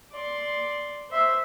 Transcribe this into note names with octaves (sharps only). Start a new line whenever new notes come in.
D5 C6
C5 E5